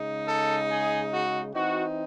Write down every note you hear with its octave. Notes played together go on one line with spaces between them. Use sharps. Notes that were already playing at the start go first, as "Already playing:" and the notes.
Already playing: C#3 G#3 D#4
A4
G#4
F#4
E3 C4 D#4 F#4